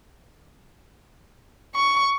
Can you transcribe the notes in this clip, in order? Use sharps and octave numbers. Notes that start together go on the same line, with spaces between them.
C#6